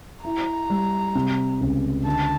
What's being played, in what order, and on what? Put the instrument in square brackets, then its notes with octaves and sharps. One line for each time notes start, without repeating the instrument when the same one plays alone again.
[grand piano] E4 [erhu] A#5
[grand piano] G3
C3
C#2
[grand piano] D3 [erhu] A5